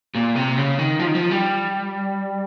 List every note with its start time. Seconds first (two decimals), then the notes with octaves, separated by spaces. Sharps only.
0.16 A#2
0.36 C3
0.57 C#3
0.79 D#3
0.99 F3
1.07 D#3
1.15 F3
1.31 G3